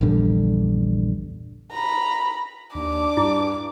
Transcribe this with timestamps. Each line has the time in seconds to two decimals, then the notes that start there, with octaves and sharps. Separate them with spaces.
0.01 A#1 E2 G2 D3
1.72 A#5 B5
2.75 D#2 D4 D6
3.17 G2 E4